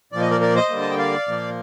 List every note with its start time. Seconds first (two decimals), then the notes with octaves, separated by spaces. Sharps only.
0.12 A#2 F3 A#3 D5
0.21 D#5
0.30 A#4 D5
0.41 A#4 D5
0.55 C5 D#5
0.70 D3 G3 A#3
0.81 A5
0.90 G5
0.98 D5 F5
1.28 A#2 F3 A#3